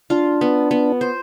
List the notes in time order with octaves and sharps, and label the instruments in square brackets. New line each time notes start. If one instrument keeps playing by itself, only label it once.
[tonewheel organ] D4 [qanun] F4
[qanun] B3
B3
C5